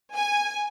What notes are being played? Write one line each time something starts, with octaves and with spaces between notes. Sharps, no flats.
G#5